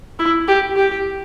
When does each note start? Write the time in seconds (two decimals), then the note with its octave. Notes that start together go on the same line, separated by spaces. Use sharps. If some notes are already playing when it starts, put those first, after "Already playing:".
0.19 E4
0.48 G4
0.77 G4